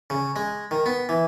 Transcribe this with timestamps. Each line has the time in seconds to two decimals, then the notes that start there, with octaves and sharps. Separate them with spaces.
0.10 C#3
0.36 G#3
0.71 D#3
0.86 B3
1.09 E3